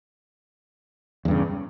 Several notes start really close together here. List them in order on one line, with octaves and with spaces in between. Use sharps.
E2 G2 C#3